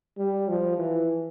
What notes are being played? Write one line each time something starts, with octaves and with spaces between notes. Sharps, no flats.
G3
F3
E3